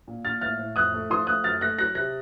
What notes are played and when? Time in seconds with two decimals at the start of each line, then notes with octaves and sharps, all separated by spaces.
0.08 A#2
0.25 A#2 F6 A6
0.41 A2 F6 A6
0.59 A2
0.76 F2 D#6 F#6
0.94 A3
1.10 F3 C6 D#6
1.27 A3 D#6 F#6
1.44 F#2 F6 A6
1.61 A3 F#6 A#6
1.78 F#3 F#6 A#6
1.95 C3 F#6 A#6